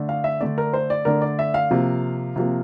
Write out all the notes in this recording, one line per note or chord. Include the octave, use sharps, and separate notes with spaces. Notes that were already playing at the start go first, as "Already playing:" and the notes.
Already playing: D3 A3 D4
F5
E5
D3 A3 D4 D5
A#4
C5
D5
D3 A3 D4 A#4
D5
E5
F5
C3 F3 A#3
C3 F3 A#3